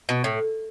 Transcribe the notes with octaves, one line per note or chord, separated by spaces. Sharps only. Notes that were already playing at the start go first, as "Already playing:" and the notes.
B2
A2